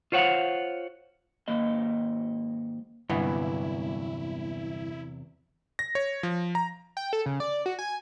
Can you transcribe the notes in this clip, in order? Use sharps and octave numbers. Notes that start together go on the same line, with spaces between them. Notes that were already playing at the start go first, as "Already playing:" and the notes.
F4 C5 C#5 F5 F#5
G#2 D#3 A#3 D#5
G1 E2 C3 E3 F#3 B3 E4
A#6
C#5
F3
A#5
G5
A4
C#3
D5
F#4
G#5